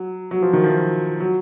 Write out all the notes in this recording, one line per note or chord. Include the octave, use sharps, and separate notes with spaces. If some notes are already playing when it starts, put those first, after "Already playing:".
Already playing: F#3
F#3
F3
D#3
F3
F#3